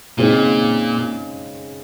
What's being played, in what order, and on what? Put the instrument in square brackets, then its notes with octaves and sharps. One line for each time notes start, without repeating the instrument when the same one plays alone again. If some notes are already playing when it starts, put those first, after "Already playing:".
[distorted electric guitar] A#2 [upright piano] C#3 G#3 C4 D#4